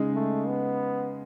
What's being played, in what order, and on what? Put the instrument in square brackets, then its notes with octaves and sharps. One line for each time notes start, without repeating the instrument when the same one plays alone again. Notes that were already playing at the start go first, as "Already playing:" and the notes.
Already playing: [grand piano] C#3 G#3 D#4
[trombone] A3
B3